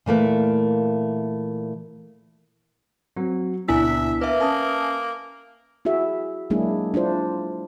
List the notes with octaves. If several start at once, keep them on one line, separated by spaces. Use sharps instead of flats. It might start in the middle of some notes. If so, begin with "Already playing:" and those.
A#2 E3 A3 A#3
F#3 C4
C#2 A#2 B3 D4 E4 E5 G#5 B6
A#3 B4 E5
C#4 G#5 A5 D#6
E4 F#4 G#4 E5
F#3 G#3 A#3 D4 E4 G#4
D4 E4 F4 C5